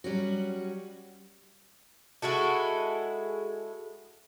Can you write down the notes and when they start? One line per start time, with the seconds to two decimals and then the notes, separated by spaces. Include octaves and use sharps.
0.04 F#3 G3 C#4 F#4
2.22 G#3 E4 F#4 A4